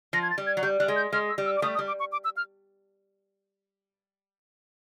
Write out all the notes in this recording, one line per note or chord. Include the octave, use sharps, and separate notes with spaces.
F3 A#6
G#6
A6
G3
G#6
F#3
G3 G6
G3 F#6
G#3
G6
G#3 F6
E6
G3
E6
D6
G3 A3 D#6
D#6
G3
D6
C#6
D6
E6
F6